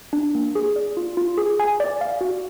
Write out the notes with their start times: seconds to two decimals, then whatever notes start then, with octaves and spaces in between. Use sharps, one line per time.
0.13 D4
0.35 A#3
0.55 G#4
0.76 D5
0.97 F4
1.17 F4
1.38 G#4
1.60 G#5
1.80 D5
2.01 F5
2.21 F#4